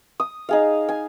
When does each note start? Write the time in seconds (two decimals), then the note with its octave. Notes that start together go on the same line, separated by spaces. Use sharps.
0.20 D#6
0.49 D#4 G#4 F5
0.89 G#5